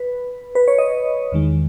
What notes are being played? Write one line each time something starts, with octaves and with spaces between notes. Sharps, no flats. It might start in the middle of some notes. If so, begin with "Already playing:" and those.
Already playing: B4
B4
C#5
D#5
E2 D#3 G#3